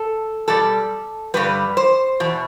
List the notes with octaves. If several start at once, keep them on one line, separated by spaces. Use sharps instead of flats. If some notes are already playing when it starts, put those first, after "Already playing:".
Already playing: A4
B2 G3 A4
G2 D3 G3 B4
C5
E2 B2